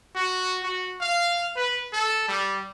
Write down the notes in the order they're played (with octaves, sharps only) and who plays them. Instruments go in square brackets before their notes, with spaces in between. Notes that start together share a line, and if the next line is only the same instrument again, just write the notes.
[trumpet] F#4
F#4
F5
B4
A4
G3